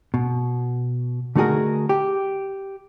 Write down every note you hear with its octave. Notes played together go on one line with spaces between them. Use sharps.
B2
D3 A3 D#4 F#4 G#4 A#4
G4